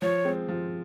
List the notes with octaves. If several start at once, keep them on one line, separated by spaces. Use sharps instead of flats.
F3 C#5
G#3 C4
F3